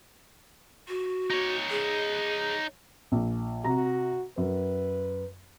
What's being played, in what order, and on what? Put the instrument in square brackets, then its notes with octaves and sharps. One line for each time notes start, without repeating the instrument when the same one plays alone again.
[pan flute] F#4
[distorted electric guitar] D#4 C#5
[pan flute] G#4
[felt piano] A#1
[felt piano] C3 A#5 [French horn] F#4
[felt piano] F#2 [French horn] B4